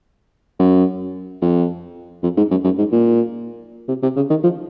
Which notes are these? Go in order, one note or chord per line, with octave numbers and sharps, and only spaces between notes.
F#2
F2
F2
G#2
F#2
F#2
G#2
A#2
C3
C3
C#3
D#3
F3